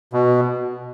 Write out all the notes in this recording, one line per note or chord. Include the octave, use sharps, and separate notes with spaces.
B2